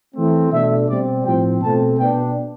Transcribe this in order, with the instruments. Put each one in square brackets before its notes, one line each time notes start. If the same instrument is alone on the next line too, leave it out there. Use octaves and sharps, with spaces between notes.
[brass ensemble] E3 A3 C4
B2 A3 D4 E5
B2 G3 C4 D5
A2 F3 C4 G5
B2 A3 C4 A5
B2 B3 D4 G5